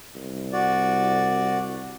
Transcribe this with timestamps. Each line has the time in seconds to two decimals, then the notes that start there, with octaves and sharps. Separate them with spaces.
0.16 C2
0.53 F#4 D5